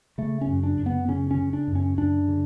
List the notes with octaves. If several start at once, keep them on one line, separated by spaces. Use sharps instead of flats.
C#3 A3
C#4
F#2
D4
F#2
B3
C#3 C#4
C#4
C#3
D4
F#2
C#4
F#2 D4
C#3